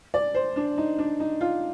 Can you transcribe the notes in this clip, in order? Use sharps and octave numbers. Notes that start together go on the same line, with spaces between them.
D5
C5
D4
D#4
D4
D#4
F4